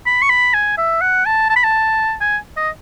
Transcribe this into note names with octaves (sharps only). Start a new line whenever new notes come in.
B5
C#6
B5
G#5
E5
F#5
A5
A5
B5
A5
G#5
D#5